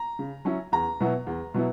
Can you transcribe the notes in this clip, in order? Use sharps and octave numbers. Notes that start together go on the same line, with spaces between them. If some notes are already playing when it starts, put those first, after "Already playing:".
Already playing: A#5
C#3
F#3 C#4 E4
E2 A#5
B2 F#3 B3 E4
E2
B2 F#3 B3 E4